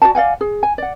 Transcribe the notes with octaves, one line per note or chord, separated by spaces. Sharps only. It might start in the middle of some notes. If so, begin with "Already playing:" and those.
F#4 B4 D5 A5
D5 F5 F#5 G#5
G#4
G#5
D5 F#5